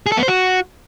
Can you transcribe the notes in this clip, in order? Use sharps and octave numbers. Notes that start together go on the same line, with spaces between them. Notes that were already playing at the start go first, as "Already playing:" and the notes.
G#4
A4
B3
C5
F#4